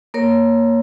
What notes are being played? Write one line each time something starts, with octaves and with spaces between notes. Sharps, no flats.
A#3 A#4 C#5